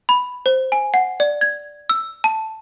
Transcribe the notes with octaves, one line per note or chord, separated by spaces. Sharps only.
B5
C5
G#5
F#5
D5
G#6
E6
A5